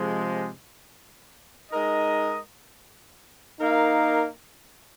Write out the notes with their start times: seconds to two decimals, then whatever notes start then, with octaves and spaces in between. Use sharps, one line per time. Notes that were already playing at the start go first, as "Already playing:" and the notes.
Already playing: C3 F3 G#3
1.71 G#3 D#4 A#4 D#5
3.60 A#3 D#4 A#4 F5